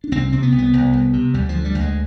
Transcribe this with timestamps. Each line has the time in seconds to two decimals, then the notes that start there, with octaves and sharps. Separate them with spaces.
0.04 D4
0.12 C2 C4
0.32 C3 C4
0.42 B3
0.52 C2
0.58 B3
0.73 C2
0.93 C2
1.13 C3
1.34 D2 G3
1.49 F3
1.54 D3
1.65 G3
1.75 D2
1.80 G#3